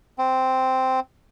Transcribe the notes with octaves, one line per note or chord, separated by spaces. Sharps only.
C4